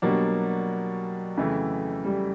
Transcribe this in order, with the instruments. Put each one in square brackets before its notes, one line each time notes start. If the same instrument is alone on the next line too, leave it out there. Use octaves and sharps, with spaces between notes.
[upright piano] B2 G3 A#3 D4 [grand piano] F#3
[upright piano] F2 C#3 E3 A3
[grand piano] G3